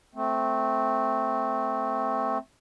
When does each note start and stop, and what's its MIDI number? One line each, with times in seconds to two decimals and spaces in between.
0.15 2.38 57
0.15 2.38 60